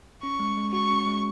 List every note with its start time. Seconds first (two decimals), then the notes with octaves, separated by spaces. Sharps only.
0.22 C#4 C#6
0.40 G#3
0.57 G#3
0.73 F#4 C#6
0.91 C#4
1.06 G#3